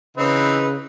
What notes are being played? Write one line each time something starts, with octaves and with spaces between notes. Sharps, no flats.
C#3 E3 C4 D#4 B4